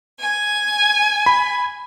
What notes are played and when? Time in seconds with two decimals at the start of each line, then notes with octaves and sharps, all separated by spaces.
0.20 G#5
1.26 B5